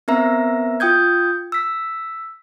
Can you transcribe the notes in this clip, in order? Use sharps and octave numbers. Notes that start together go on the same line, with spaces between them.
B3 C4 A#4 E5 A#5
F4 G5 D#6 G6 G#6
E6 B6